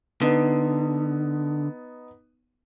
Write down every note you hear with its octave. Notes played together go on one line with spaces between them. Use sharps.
D3 B3 D#4